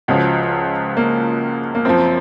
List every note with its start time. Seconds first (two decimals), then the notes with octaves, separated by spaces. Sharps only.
0.08 C#2 C#3 F3 F#4
0.97 A#3
1.75 A#3
1.85 F#2 F3 C4